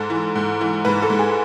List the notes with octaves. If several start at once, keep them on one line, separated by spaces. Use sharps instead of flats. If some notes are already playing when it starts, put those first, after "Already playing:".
Already playing: G#2 A4
E3
G#2
E3
G#2 B4
A4
G#2
G#4